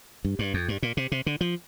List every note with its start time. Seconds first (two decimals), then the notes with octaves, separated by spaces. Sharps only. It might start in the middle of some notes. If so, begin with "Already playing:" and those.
0.25 G2
0.39 G2
0.54 F2
0.68 G2
0.83 A#2
0.97 C3
1.12 C3
1.26 D3
1.41 F3